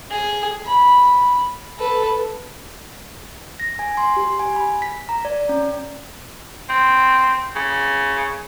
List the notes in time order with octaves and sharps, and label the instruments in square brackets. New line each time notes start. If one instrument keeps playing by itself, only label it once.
[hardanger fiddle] G#4
B5
A4 B4
[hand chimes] A#6
G#5
C6
G4
G#5
B5
B6
A#5
D5
C#4
[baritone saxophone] C4
C#3